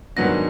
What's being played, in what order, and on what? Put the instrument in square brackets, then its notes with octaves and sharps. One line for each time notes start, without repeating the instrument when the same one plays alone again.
[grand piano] G#2 D#3 F#3 B3 D4 [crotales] A#6